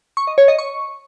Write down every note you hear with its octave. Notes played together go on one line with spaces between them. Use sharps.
C#6
D#5
C#5
D#5
C#6